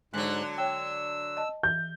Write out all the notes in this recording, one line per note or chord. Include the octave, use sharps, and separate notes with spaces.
G#2 D3 F#3 G#3 F#6
C#5 G5 E6
D#5 A5
E3 G6